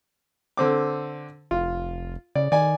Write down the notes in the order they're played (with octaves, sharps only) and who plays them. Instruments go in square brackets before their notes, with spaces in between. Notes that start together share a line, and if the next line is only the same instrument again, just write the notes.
[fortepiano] D3 C4 D6
[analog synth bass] F1 [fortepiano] F4
[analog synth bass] C#3 [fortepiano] D5
[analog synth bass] D#3 [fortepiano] D5 G#5